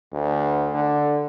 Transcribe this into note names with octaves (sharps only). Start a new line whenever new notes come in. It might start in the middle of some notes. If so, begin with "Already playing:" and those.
D2
D3